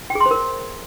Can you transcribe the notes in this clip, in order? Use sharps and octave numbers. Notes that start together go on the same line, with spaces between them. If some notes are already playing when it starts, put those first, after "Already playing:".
G5
G#4
C6
C5
A#4